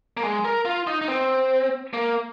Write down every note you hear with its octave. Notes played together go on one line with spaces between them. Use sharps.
A#3
G#3
A#4
F4
D#4
D#4
C4
A#3